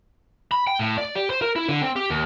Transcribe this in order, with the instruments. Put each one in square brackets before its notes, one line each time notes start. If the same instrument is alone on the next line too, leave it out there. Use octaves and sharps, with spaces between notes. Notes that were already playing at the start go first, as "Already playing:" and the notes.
[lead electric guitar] B5
G5
A2
D5
G4
C5
A#4
E4
D3
C4
G4
D#2